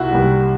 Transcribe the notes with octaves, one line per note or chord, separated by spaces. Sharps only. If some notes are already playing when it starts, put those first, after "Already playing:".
Already playing: C2 C3 E4 F#4
C2 C3 G3